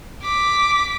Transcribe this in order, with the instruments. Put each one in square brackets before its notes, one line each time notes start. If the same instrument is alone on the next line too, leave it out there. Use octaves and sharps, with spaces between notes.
[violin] D6 B6